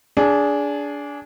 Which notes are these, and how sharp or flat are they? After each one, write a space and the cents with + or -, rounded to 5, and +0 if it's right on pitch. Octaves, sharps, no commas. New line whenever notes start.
D4 -20 G#4 +0